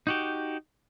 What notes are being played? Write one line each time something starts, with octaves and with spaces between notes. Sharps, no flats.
D#4 F#4 G4